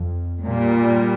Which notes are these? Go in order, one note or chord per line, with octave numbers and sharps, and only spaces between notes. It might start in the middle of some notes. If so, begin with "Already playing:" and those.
Already playing: F2
A#2 G3